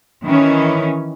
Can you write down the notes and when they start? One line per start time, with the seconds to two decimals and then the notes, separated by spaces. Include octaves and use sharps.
0.24 D#3 E3 C#4